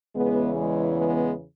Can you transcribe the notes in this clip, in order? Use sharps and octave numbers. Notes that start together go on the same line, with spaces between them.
E2 C#3 E3 G#3 B3
G#3
G#3 B3